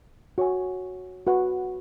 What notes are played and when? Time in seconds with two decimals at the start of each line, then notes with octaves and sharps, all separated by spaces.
0.38 F#4 C#5 G#5
1.27 F#4 B4 F#5 C#6